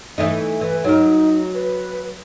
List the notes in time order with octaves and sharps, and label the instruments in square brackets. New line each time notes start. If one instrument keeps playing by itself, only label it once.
[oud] E3 A3 D#4
[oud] E3 [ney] B4
[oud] F#3 A#4 [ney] D#4
[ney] B4